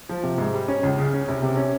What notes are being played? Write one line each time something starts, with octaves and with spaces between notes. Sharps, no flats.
F3
C3
G#2
G3
C#4
C#2
C#3
C#4
C2
C3
C#4